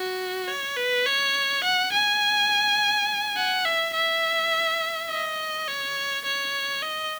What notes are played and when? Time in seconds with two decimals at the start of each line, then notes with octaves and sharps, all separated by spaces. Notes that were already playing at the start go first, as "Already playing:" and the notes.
Already playing: F#4
0.48 C#5
0.77 B4
1.06 C#5
1.64 F#5
1.92 G#5
3.36 F#5
3.65 E5
3.94 E5
5.10 D#5
5.68 C#5
6.25 C#5
6.82 D#5